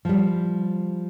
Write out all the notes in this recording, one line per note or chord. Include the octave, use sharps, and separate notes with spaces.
F3 G3